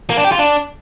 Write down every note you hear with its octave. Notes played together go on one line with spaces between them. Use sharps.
A#3
D4
G4
F4
D4